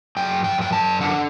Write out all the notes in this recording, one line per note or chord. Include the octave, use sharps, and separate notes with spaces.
F#2 G5
G5
F#2 G5
A5
D3 F#5